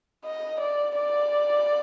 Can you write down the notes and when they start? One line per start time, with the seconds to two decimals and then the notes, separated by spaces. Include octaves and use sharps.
0.24 D#5
0.60 D5
0.95 D5